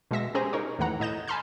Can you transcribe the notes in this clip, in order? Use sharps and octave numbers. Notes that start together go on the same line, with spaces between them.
B2 G#3 E5 A#6
C#4 G4 G#4 C5 A#5
D#4 A#4 C#5
D#2 A2 E3 F#5 A#5
A2 D#5 G6 E7
G#5 A5 B5 C6 F6 G6